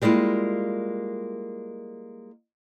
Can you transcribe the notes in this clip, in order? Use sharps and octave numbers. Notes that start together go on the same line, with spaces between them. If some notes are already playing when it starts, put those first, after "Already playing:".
G3 G#3 A#3 E4 F4